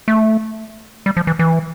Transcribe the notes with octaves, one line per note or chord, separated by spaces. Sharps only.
A3
G3
F3
E3
E3